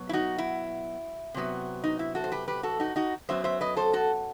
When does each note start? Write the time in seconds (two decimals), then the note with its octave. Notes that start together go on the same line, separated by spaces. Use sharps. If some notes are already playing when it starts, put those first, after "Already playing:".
Already playing: B2 F#3 B3
0.09 E4
0.13 D#4 F#4
0.38 E4
1.34 C3 F#3 B3
1.84 D#4
1.99 E4
2.15 F#4 A4
2.24 C5
2.32 G4 B4
2.48 G4 B4
2.63 F#4 A4
2.80 D#4 F#4
2.96 D#4 F#4
3.29 F#2 F#3 B3 C5 E5
3.44 C5 E5
3.61 B4 D#5
3.77 A4 C5
3.93 F#4 A4